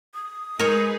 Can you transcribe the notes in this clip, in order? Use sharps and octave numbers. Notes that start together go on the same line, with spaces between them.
D#6
G#3 D#4 G#4 A#4 B4 C#5